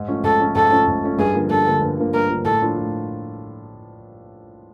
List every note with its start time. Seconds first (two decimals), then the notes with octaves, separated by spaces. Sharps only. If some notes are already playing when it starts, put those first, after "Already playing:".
Already playing: G#2
0.08 F3 A3 C#4
0.24 G#2 A4
0.39 F3 A3 C#4
0.55 G#2 A4
0.71 F3 A3 C#4
0.88 G#2
1.03 F3 A3 C#4
1.18 G2 G#4
1.34 D3 F3 A#3
1.50 G2 A4
1.66 D3 F3 A#3
1.81 G2
1.98 D3 F3 A#3
2.14 G2 A#4
2.29 D3 F3 A#3
2.45 A2 A4
2.61 F3 A#3 D4 F4
2.77 A2